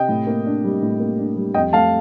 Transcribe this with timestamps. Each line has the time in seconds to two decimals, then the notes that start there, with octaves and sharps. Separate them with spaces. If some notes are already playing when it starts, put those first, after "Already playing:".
Already playing: C3 D#5 G5
0.09 A2
0.27 A#3
0.46 D4
0.64 G3
0.82 A2
1.00 A#3
1.19 D4
1.36 G3
1.54 F2 D#5 G5
1.73 A3 F5 A5